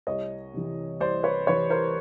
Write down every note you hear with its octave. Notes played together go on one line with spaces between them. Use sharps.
C2 C#5 D#5
C3 E3
C2 C5 D5
B4 C#5
C3 E3 B4 C#5
A#4 C5